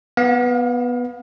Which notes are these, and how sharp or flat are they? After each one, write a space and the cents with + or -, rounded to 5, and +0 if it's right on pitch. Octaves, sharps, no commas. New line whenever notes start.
B3 -5 F5 +35